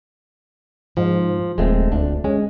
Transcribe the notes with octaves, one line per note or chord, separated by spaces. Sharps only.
G#2 F3
D#1 G#3 A3 C4
D2 D4
G#3 C#4